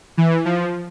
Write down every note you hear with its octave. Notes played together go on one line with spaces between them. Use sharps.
E3
F3